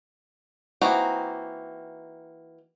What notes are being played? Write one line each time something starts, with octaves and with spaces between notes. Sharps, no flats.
E3 A#3 C4 D#4 F#4